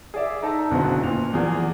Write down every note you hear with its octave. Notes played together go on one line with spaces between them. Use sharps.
G#4 D5 E5
D#4 A4 E5 A5 A#5
F#1 B2 D3 F#3 B3 C4
A#2 F7
E2 F3 G#4 D5 F#5